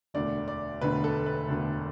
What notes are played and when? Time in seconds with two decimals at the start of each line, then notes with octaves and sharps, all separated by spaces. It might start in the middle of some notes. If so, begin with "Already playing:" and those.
0.14 E1 D2 D3 D5
0.48 D5
0.81 E1 D2 D3 B4
1.04 A4
1.26 B4
1.49 E1 D2 D3